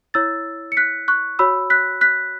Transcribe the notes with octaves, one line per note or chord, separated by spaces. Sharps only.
E4 C#5 E6 A6
C#7
F#6 B6
C#6 F#6
F#4 C#5 B5 E6
F#6 B6
F#6 B6